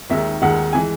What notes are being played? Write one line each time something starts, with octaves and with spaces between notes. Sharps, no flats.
D#2 D#3 G#3 E5
D#2 D#3 G#3 F#5
E3 G#3 G#5